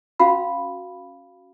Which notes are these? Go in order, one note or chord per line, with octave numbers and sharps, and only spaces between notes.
C#4 F#4 F5 B5